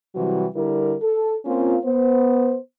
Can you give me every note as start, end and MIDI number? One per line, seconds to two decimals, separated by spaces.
0.15 0.46 48
0.15 0.46 52
0.15 0.46 54
0.15 0.46 55
0.15 0.46 64
0.15 0.46 66
0.55 0.96 50
0.55 0.96 55
0.55 0.96 64
0.55 0.96 70
1.02 1.34 69
1.46 1.76 58
1.46 1.76 60
1.46 1.76 61
1.46 1.76 65
1.85 2.56 59
1.85 2.56 72